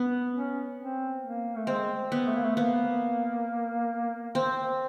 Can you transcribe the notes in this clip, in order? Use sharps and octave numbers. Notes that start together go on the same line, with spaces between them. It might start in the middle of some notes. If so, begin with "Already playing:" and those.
Already playing: B3
C#4
C4
A#3
A3
G#3 C4
B3
A3
A#3
A3
A#3 B3
C4